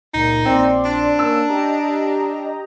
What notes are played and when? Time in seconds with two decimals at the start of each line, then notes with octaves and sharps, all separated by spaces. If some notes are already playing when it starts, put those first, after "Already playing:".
0.14 C#2 A#2 D#4
0.45 A#1 C4 D5 C6
0.85 D4
1.19 A#3 C#4 E6
1.48 G4 D#5 A#5